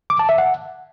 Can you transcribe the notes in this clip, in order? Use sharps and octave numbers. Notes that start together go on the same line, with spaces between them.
D6
A5
E5
F#5